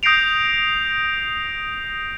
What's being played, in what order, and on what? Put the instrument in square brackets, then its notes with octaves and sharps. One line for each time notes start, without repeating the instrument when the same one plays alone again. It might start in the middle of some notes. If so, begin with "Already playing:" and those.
[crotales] D#6 G6 A#6 C7 D7 F7